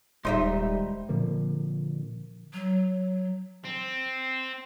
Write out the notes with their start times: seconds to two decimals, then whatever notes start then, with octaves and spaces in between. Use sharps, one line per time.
0.25 D#1 G3 G#3 D#4 C5 D#5 E5 C6
1.09 A#2 D3 F3 A#3
2.54 F#3
3.64 C4